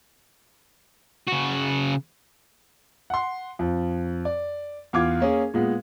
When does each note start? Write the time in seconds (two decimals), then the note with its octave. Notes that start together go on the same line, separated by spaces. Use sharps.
1.28 C#3 F#4
3.10 F#5 C6
3.59 F2
4.25 D5
4.93 E2 F4 D6 G#6
5.20 A#3 C#4 G#4
5.54 A#2 G#3 B3